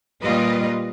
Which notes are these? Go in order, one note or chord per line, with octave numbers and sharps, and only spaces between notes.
A#2 G3 F4 B4 D#5